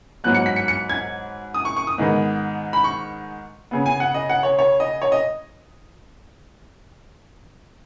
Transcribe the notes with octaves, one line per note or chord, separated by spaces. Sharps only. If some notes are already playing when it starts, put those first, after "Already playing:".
G#2 F#3 B3 F#6
C#7
B6
C#7
C#7
G#6
D#6
C#6
C#6
D#6
G#2 D#3 G#3 B3
B5
C#6
C#3 B3
G#5
F#5
D#5
F#5
C#5
C#5
D#5
C#5
D#5